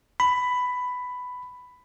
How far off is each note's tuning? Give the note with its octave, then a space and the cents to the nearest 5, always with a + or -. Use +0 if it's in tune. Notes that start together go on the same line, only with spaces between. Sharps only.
B5 +10